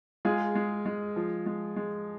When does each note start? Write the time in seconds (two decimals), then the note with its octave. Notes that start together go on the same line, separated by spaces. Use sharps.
0.25 G#3 F4 G#4
0.55 G#3
0.86 G#3
1.16 F3
1.46 G#3
1.76 G#3